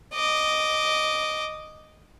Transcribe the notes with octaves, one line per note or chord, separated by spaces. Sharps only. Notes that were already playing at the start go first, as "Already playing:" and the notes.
D#5 D6